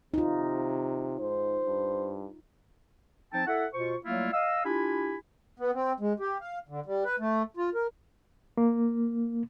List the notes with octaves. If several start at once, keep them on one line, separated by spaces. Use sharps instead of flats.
C3 D#4 F4
G#2 C5
G2
F3 C4 D#4 G5 A5
E4 A4 E5 F#5
B2 F4 C5 C#6
F#3 G3 A3 A#3 E4 F4
D#5 F5 E6
D4 E4 F4 G4 G#5 B5
B3
C4
G#3
G4
F5
D3
G3
B4
A3
F4
A#4
A#3